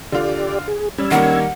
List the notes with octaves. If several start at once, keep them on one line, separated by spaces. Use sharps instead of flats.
D3 F4 G4 D5
G#4
G3 C#4 E6 G#6
D#3 G3 A#3 F#5